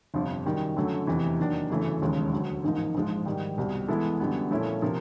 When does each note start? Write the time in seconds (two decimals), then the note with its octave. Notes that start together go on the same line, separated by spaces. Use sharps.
0.14 G1 F2 C3 F3
0.46 F#2 D#3 G3
0.77 F#2 D3 F#3 A3
1.07 F1 E2 C3 E3
1.39 D#3 F#3 A#3 D4
1.70 G1 F#2 C#3 E3 A3
2.02 E1 D#2 C#3 F3 G#3
2.32 D2 D3 F#3
2.64 A1 G#2 F3 A#3 D#4
2.95 A#1 G#2 F3 G#3
3.26 G#2 D#3 G3
3.57 C2 B2 G3
3.88 E3 G#3 B3 E4 A4
4.20 F#2 D3 G3 B3
4.51 A#2 F3 A3 C#4 E4
4.82 C3 F3 A#3